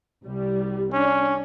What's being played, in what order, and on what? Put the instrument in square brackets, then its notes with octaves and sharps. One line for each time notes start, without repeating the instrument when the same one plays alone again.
[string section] C2 G3
[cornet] C#4 [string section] D4